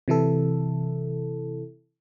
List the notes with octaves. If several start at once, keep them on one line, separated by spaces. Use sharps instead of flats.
C3 E3 E4 A4